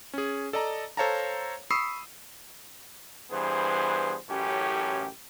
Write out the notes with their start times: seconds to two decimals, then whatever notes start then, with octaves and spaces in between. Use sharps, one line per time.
0.14 C#4 G#4
0.53 A4 D5 D#5 A5 A#5
0.97 A4 C5 C#5 F5 A5 A#5
1.70 B5 C#6 D#6 E6 C7
3.31 G2 E3 B3 G#4 C5
4.29 A1 F#2 A2 C#4 G4